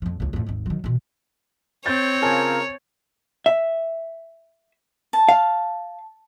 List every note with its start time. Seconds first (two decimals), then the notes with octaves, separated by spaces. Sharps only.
0.02 F2 F3
0.20 C#2 C#3
0.33 F2 A2
0.46 G#1 D#2
0.66 D#3 F#3
0.84 B2 E3
1.86 C4 C#5 G6 A6
2.22 C#3 F4 A#4 G#5 A5 G#6
3.46 E5
5.13 A5
5.29 F5